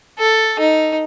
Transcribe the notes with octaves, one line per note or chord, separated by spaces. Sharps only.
A4
D#4